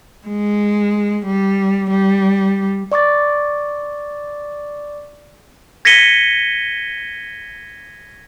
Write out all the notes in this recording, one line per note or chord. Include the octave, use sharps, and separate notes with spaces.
G#3
G3
G3
D5 C#6 D6 A6
G#6 A#6 B6 C#7 D#7 G7